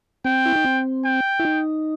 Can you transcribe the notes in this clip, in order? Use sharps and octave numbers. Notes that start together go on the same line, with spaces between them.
C4 G5
E4
D#4
C4
G5
E4
D#4